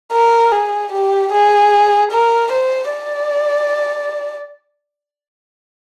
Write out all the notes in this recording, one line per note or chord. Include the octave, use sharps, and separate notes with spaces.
A#4
G#4
G4
G#4
A#4
C5
D5